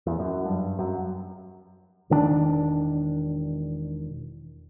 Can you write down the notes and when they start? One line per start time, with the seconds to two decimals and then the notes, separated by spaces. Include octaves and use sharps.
0.06 E2
0.20 F#2
0.46 G2
0.79 F#2
2.10 E1 D#3 C4 D4